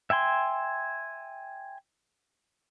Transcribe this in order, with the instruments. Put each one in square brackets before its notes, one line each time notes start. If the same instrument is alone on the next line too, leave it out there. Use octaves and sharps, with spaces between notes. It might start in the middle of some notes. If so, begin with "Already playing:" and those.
[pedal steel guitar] E5 G5 G#5 C6